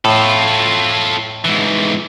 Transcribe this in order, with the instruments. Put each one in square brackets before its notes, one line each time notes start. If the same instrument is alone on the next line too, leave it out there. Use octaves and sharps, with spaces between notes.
[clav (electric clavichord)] A2 [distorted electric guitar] F4 A4
[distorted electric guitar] G#2 E3